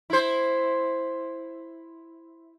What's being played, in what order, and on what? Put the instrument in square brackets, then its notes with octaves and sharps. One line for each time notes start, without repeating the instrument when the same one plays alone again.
[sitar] E4 C5